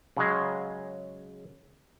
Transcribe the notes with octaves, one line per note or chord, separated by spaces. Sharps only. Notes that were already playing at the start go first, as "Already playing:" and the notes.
C#3 F#3 G#3